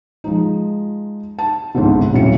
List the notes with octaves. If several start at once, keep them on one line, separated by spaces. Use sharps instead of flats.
F3 G#3 D#4
A5
G1 C2 G#2 D3
D#1 A#1 F#2 A2 C#3 C#7